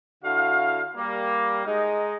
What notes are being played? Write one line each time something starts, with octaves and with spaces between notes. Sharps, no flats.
D3 E4 F#4 F5
G3 A#3
G#3 D#4